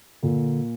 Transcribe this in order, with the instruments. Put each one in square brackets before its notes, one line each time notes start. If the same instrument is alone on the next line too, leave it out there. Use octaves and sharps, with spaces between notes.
[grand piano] A#2 A#3 [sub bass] D3